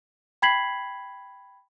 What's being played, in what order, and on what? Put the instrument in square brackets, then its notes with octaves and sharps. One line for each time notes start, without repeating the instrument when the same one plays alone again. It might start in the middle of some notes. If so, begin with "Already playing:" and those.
[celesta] G5 B5 G#6 B6 C7 F#7